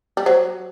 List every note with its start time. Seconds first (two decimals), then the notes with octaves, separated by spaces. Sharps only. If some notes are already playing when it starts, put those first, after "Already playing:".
0.17 G3
0.26 F#3 C5